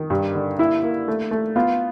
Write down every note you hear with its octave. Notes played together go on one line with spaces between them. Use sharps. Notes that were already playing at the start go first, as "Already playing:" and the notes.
Already playing: D#3
G2
D3
A#3 E4
A#3
A3
A3
B3 F4